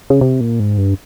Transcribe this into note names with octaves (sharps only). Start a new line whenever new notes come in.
C#3
C3
A#2
G#2
G2